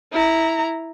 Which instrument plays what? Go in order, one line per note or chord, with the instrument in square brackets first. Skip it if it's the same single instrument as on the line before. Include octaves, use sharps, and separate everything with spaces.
[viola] E4 A#5